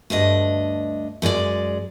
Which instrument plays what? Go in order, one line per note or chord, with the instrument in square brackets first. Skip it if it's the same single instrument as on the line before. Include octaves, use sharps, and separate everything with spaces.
[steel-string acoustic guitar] D2 G2 D4 D#5
F#2 G#3 G#4 D5